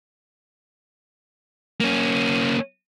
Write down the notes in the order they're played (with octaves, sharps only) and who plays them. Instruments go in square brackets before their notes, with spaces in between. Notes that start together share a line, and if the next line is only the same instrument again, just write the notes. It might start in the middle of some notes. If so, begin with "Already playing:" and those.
[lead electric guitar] A#3 C#4